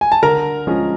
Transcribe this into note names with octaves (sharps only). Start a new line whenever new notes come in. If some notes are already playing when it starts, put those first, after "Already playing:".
G#5
A5
D3 A#4 A#5
F3 G#3 C#4